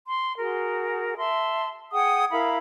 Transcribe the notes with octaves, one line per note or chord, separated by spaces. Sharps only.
C6
F#4 G#4 A#4
E5 A5 C6
G#4 F#5 G5 D#6
E4 A#4 F5 B5